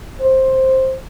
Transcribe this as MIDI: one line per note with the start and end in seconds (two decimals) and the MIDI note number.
0.21 0.95 72